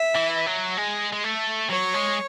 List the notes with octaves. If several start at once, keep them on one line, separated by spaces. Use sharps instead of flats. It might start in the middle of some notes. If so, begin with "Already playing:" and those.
Already playing: E5
E3
F#3
G#3
G#3
A3
F#3 C#5
G#3